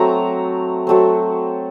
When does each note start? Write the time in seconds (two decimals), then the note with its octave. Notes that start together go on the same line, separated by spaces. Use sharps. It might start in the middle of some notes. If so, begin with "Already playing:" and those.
Already playing: F#3 A3 C4 A#5
0.87 F#3 A3 C4